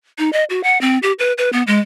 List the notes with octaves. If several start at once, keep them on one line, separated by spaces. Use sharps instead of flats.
D#4
D#5
F#4
F#5
C4
G4
B4
B4
B3
G#3